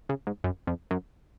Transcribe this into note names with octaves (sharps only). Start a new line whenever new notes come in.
C#3
G#2
F#2
F2
F#2